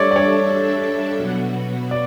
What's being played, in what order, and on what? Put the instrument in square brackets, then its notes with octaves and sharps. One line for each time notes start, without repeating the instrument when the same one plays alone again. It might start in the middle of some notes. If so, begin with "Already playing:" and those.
Already playing: [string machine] G3 D4 A4 E5 [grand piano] C#5 D5
[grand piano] D5
C#5
[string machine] B2 F#3 B3 F#4
[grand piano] D5